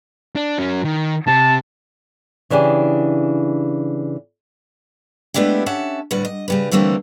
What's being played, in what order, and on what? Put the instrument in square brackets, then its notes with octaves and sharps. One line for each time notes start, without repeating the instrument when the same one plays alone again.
[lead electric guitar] D4
F#3 C#4
D#3
[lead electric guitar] C3 [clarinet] A5
[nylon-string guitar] C#3 E3 D4 G4 G#4
[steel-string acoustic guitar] G#3 A3 B3 D4 E4 G4
C#4 E5 F#5 A5
D2 A2 G3 B4 F#5
D#5
C#3 G3 B4
D3 E3 G3 A3 A#3 C4